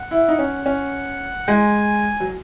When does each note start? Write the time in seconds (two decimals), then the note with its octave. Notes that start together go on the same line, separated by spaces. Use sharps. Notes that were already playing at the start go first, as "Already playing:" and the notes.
Already playing: F#5
0.11 E4
0.29 D#4
0.39 C#4
0.66 C#4
1.48 G#3 G#5
2.20 F#3